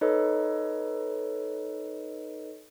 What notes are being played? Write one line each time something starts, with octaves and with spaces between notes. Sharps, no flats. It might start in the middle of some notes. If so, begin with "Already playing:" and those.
D#4 A4 B4 C#5 D#5